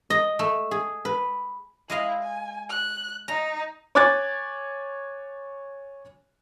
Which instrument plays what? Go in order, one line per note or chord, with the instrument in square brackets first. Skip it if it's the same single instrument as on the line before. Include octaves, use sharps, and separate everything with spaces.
[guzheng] D#5
A3
G#4
B4
[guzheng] G#3 D#5 F5 [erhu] E4
[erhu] G#5
F#6
[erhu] D#4 [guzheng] A#5
[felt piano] C#5 G#5 D6 F#6 G#6 A6